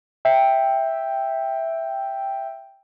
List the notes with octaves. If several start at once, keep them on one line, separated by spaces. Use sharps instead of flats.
E5 G5